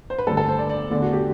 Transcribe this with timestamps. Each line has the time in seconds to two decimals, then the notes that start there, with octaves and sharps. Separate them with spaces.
0.10 C5
0.18 B4
0.27 G2 D3 A3 A4
0.37 A4
0.48 C5
0.58 D5
0.70 D5
0.90 E2 D3 A3 D5
1.02 F#4
1.13 G4